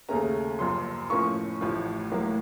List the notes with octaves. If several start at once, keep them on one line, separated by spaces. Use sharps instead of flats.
D#2 C#3 A3 C#4 A#5
F#1 F#2 F3 C6
A2 F3 A#3 C#4 C#6
A1 A2 F3
A1 A2 F#3 A#3